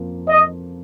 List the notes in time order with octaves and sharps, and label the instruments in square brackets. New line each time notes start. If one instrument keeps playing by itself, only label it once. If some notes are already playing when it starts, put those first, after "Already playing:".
Already playing: [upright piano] F2 F3 A#3
[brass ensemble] D#5